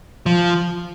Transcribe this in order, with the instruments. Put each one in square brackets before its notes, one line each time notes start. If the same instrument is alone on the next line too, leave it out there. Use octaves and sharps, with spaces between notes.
[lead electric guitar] F3